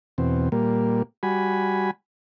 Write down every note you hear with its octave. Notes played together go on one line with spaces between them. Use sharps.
E2 B2 C4
A#2 G3 A#3
G3 F#4 G#5 B5